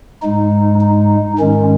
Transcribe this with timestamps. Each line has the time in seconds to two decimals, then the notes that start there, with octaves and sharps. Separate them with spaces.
0.22 G#2 G#3 D#4
0.81 D#4
1.39 G#2 D#3 G#3 C#4